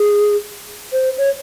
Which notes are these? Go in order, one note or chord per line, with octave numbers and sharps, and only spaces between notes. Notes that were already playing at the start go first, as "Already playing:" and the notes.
Already playing: G#4
C5
C#5